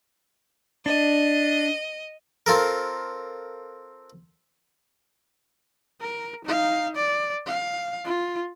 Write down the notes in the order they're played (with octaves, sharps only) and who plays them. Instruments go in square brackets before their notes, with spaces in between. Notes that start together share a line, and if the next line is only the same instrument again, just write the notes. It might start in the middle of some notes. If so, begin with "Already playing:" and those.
[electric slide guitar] D4 [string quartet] D#5
[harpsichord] C4 F4 A4 A#4
[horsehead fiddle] A#4
D#4 F5
D5
F5
F4